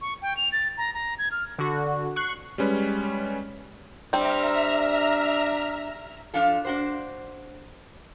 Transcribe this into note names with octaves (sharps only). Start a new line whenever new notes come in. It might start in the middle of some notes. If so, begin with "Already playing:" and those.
C#6
G5
F7
A6
A#5
A#5
G#6
F6
D3 F#4
C#6 F#6 C7
G3 G#3 C#4 B4
G3 C4 D4 E5 A#5 F6
F3 D4 F4 A4
D4 F#4 C5